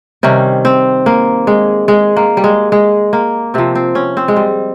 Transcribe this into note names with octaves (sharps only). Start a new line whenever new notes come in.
C3 D#3 G3 C#4
C4
A#3
G#3
G#3
A#3
G3
G#3
G#3
A#3
C3 F3 C4
C4
C#4
C4
G#3
G3